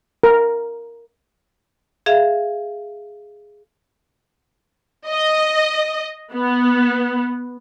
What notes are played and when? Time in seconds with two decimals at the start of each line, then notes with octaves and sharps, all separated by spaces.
0.24 A#4
2.06 G#4 E5 F5
5.07 D#5
6.32 B3